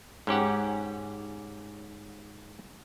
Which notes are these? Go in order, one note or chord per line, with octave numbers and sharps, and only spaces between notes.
G#2 C#4 G4 F#5